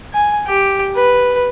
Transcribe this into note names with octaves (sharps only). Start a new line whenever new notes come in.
G#5
G4
B4